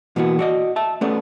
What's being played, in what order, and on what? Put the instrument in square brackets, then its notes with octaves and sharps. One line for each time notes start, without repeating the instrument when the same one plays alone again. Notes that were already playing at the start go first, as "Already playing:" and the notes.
[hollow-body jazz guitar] B2 E3 A#3 B3 C#4 F#4
F#4 D5 D#5
E5 A5
A3 B3 C#4 A4 D5